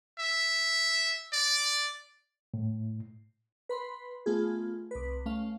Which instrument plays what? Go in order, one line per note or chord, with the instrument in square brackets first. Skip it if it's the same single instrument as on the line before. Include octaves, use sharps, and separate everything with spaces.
[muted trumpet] E5
D5
[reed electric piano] A2
[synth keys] B4 B5 C6
A3 B3 F4 G#4
C2 B4
A3 C#4 F5